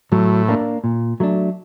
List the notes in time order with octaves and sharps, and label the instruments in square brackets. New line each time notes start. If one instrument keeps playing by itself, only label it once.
[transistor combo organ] A2 [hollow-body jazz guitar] F#3
[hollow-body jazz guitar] A#3 D4
A#2
F#3 A3 D4